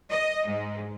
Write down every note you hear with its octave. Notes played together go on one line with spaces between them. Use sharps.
D#5
G#2